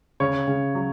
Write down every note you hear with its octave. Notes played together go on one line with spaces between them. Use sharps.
C#3 C#5
C#3
F#3